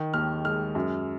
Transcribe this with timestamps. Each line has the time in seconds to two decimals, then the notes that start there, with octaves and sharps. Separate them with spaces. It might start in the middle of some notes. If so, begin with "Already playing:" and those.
Already playing: D#3
0.14 D#2 F6
0.44 G#3 F6
0.75 F#2